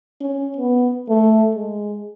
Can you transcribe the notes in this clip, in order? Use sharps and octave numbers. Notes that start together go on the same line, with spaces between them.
C#4
B3
A3
G#3